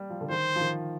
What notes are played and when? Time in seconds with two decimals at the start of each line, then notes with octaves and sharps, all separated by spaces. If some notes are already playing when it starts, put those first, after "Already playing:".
Already playing: G3 A#3
0.10 F3
0.21 D3
0.30 D#3 C5
0.56 F3
0.60 D#3